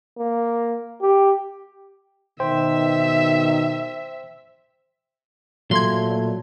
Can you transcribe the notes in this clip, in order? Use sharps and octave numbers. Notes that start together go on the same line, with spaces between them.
A#3
G4
B2 D#3 C5 E5 G5
A#2 F#3 A3 C6 G#6